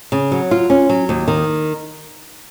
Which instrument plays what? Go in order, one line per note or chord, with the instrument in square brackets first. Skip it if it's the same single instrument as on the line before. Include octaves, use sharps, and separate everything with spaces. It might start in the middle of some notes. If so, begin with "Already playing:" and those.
[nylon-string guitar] C#3
F#3
F4
C#4
F#3
D#2
D#3